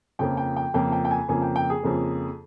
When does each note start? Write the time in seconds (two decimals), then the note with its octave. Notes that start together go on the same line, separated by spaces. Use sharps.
0.19 F2 C#3 F3 A#3 G5
0.37 G5
0.57 G5
0.74 F2 C#3 F3 A#3 G5
0.92 G5
1.05 G5
1.11 G#5
1.28 F2 C#3 F3 A#3 G#5
1.42 G5
1.56 G5
1.70 G#4
1.83 F2 C#3 F3 A#3